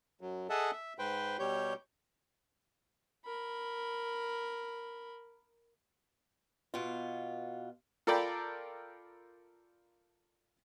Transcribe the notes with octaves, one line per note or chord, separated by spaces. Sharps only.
F#2 F#3
G#4 A4 D#5 E5 F#5 A5
E5
G#2 B4 C5 G5
B2 G3 G4 C#5 G6
A#4 B5
B2 F4
F4 A4 A#4 D5 G5 B5